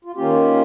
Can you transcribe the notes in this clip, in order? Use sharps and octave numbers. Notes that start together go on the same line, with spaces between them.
F4
D#3 A#3 C#4 F4 G4